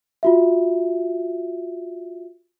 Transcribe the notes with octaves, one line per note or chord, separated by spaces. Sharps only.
F4 F#4 E5